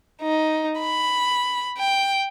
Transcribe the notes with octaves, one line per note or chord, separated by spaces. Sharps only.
D#4
B5
G5